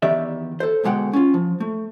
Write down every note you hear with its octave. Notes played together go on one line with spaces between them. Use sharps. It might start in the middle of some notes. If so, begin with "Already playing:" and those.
E2 D#3 G4 D5 E5
A4 C5
D2 B2 G#3 F#5 G5
C#4 F4
F3
A3